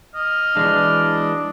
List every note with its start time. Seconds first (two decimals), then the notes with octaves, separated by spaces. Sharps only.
0.15 D#5 F6
0.57 E3 G#3 D4